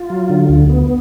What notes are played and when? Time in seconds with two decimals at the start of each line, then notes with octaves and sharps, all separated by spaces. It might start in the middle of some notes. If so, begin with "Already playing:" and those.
Already playing: F4
0.10 F#3
0.30 D3
0.49 D2
0.69 B3